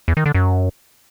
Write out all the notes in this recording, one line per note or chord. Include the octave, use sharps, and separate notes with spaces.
E2
D#3
D3
F#2